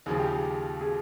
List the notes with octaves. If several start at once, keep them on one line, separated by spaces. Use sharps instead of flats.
D#2 C#3 F3 G#4
G4
G#4
G#4